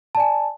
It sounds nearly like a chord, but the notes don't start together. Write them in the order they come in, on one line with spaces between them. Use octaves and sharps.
A5 D5 G#5